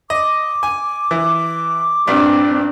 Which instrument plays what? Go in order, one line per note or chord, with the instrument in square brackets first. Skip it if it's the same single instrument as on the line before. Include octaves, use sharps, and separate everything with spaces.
[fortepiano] D#5 [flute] D6
[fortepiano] G#5
E3
[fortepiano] A#1 G2 D5 [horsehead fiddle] C4 D4